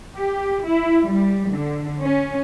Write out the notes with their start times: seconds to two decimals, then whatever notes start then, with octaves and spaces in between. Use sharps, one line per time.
0.16 G4
0.64 E4
1.03 G3
1.51 D3
2.03 C#4